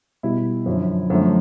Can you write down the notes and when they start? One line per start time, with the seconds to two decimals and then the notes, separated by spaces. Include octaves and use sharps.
0.23 B2 G3 E4
0.66 F#2 D3 F3
1.10 F#2 D3 F3 A3